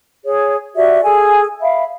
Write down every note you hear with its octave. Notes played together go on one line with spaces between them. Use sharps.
G#4 C#5
F#4 G4 D5 E5
G#4 A4 G#5
E5 F5 B5